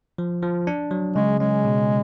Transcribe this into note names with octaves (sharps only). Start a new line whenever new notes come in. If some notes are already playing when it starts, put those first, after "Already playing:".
F3
F3
D4
F#3
C#3 G#3
G#3 C#4
B2